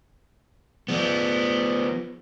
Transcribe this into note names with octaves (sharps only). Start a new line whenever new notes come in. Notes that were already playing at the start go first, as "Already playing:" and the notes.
F3 B3